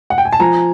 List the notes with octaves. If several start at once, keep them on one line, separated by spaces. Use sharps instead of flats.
F#5
G5
G#5
A5
F3 G#5 A#5